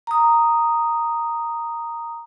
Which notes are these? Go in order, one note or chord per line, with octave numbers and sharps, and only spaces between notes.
A#5 D#6